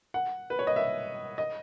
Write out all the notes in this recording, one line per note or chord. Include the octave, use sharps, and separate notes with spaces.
F#5
B4
C#5
D#5
E5
D#5